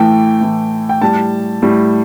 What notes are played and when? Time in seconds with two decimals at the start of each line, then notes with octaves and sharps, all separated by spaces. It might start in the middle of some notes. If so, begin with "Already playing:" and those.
Already playing: A2 E3 A3 G5
0.41 A2 E3 A3
0.89 G5
1.02 A2 G3 A5
1.62 A2 G3